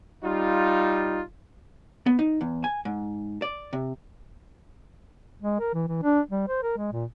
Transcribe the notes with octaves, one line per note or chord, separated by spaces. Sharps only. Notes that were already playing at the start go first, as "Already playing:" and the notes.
G3 D#4 F4
B3
D#4
E2
G#5
G#2
D5
C3
G#3
A#4
E3
E3
D4
G3
C5
A#4
G#3
A#2